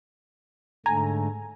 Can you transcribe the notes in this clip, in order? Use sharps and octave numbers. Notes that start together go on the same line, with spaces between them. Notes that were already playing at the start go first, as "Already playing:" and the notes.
G#2 D3 A3 G#5 A#5